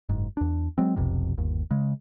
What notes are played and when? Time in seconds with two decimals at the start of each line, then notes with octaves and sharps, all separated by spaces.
0.09 F#1 G#2
0.37 E2 D4
0.78 F#3 G#3 C4
0.96 F1 B1 F2 C3
1.38 G1 D#2
1.71 C#3 G#3